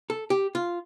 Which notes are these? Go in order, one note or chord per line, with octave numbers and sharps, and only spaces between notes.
A4
G4
F4